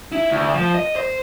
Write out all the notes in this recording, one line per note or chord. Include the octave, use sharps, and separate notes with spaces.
E4
D2
F3
D#5
C5